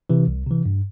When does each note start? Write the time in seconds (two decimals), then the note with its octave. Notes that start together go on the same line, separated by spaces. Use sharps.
0.10 C3 E3
0.27 C2
0.47 C3 E3
0.65 G2